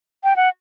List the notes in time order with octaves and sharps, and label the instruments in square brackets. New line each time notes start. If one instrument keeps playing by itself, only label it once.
[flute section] G5
F#5